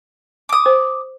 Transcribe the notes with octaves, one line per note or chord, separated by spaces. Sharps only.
D6 D#6
C5